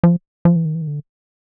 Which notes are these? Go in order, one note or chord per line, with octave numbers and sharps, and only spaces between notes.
F3
F3
E3
D#3
E3
D#3
D3